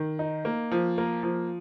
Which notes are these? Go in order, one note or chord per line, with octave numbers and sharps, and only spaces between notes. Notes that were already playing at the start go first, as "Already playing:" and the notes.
Already playing: D#3
D#4
A#3
F3
A#3
F3